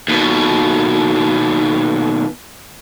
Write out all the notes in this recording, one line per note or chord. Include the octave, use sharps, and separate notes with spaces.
D#2 B2